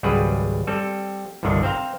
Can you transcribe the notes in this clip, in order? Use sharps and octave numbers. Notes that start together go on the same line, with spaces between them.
G#1 C#2 F#3 G3 G#4 B4
G3 C4 A4
G1 C2 D3 D#3 D4
C4 C5 F5 A#5